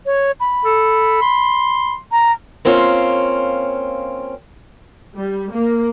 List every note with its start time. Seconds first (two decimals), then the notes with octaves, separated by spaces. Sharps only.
0.06 C#5
0.40 B5
0.65 A4
1.22 C6
2.12 A#5
2.65 A#3 C4 C#4 F4 C#5
5.15 G3
5.51 A#3